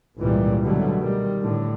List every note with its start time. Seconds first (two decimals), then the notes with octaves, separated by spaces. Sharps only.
0.18 G#1 C#2 A#2 E3 G3
0.63 B2 D3 F#3 G3 A3
0.99 D#3 G3
1.43 A2 D3